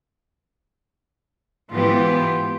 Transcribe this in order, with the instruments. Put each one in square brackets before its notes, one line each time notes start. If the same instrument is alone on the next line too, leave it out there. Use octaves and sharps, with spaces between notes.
[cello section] G#2 E3 B3 [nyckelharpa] F4 G4